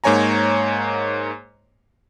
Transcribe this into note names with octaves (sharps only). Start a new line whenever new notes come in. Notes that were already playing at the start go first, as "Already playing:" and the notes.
G#2 A#3 C#5 G#5 A#5